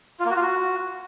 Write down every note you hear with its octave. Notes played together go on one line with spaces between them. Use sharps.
F4
A#3
F#4
F4
F#4